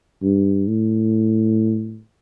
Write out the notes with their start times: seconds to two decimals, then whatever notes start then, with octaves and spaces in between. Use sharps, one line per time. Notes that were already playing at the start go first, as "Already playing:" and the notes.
0.22 G2
0.68 A2